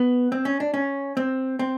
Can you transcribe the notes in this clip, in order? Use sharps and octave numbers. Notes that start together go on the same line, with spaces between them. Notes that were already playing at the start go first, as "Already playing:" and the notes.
Already playing: B3
C4
C#4
D4
C#4
C4
C4